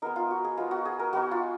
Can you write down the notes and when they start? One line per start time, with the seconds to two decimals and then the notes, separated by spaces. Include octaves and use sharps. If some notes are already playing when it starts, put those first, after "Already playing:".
0.02 G#3 B3 D#4 A#4
0.16 F4
0.31 F#4
0.44 G#4
0.57 G#3 B3 D#4 F4
0.71 F#4
0.85 G#4
0.99 A#4
1.13 G#3 B3 D#4 F#4
1.31 F4